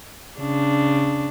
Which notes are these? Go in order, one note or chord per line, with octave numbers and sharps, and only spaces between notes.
C#3 D4